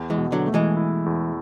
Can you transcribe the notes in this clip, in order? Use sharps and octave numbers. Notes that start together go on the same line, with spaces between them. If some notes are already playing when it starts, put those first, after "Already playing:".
Already playing: E2
E3 G#3
B2
D3 F#3
A3
E3 G#3
E4
E2